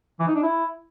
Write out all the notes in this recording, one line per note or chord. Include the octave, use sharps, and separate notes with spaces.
E3
D#4
D4
E4